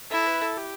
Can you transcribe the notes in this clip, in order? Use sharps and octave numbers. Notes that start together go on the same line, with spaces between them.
E4 A4
B4
A4
G4